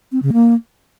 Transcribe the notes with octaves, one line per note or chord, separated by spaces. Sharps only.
C4
C#3
A#3